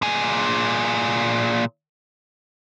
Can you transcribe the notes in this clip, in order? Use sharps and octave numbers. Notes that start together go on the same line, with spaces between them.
A#2 G#4